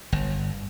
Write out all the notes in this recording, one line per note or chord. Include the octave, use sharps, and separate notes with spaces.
G1